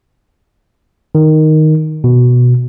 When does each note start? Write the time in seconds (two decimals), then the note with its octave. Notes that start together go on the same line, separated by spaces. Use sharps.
1.15 D#3
2.04 B2